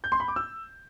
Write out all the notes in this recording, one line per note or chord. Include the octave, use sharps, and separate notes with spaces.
G6
C6
B5
D6
E6